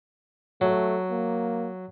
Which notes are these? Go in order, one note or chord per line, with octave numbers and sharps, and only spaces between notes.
F#3 A3
A#3